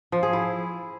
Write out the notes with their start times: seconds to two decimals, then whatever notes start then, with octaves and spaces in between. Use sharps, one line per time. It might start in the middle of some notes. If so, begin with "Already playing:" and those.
0.12 F3
0.23 G#4
0.33 E4